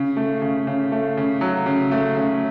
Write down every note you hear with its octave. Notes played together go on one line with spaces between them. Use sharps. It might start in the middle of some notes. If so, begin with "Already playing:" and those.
Already playing: C#3
A3
C#3
C#3
A3
C#3
F#3
C#3
A3
C#3